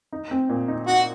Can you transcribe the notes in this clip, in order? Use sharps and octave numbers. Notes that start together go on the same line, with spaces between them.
D#4
C4
A#2
D#4
D#4 F#4